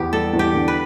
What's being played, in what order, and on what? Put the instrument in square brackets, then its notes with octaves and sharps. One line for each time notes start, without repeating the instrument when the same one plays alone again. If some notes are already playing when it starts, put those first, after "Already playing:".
Already playing: [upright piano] E2 [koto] B3 G4
[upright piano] G3 [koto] A4
[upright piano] E2
[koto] G4
[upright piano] D3
[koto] B4